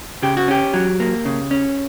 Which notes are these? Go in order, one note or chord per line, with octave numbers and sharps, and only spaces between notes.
C#3 G4
F#4
C#4 G4
F#3
A#3
C#3
C#4